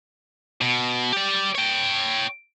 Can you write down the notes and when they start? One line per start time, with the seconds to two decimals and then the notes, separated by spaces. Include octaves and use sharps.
0.61 B2
1.12 G4 D5
1.55 C#5 G5